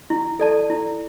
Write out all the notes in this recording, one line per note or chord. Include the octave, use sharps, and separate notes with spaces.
E4
A4 D5 A5
E4